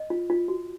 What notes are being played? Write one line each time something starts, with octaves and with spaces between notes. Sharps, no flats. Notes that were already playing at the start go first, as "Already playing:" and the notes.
Already playing: D#5
F4
F4
F#4